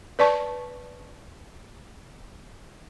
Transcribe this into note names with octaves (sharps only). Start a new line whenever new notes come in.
B4 D5 A5 C#6